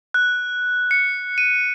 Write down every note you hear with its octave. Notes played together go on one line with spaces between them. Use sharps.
F#6
C#7
D#7